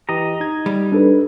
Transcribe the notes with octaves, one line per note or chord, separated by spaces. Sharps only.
E3 G4 D#5 A#5
D#4 G#6
G3
D4 A4 B4